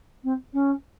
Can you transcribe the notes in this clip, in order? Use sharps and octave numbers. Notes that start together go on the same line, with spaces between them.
C4
C#4